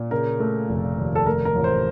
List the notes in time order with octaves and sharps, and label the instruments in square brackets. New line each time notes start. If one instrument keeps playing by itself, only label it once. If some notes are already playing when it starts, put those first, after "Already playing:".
Already playing: [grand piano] A#2
C#3 A#4
A3
F1
D#2
A4
A3 A#4
A#4
A1
C5